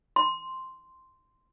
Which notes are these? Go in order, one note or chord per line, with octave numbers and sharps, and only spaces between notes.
C6